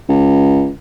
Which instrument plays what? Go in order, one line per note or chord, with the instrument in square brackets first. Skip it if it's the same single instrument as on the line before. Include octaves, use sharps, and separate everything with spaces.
[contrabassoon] C#2